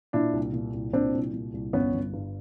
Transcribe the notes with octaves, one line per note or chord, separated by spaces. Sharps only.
A#2 D4 E4
C2
A#2
C2
A#2 C4 D4
C2
A#2
C2
G1 B3 C#4
G1
G2